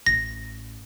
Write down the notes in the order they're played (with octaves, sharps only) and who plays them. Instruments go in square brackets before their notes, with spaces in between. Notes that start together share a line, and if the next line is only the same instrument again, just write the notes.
[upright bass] A1 [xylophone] A#6